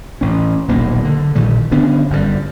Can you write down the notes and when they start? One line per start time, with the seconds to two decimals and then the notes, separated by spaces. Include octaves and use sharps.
0.21 A1 C#4
0.68 D#1 B1 A#3
1.05 D3
1.35 A#1 A#2 D#3 G3
1.72 D3 B3 C#4 D4
2.10 G1 F#2 A2 G3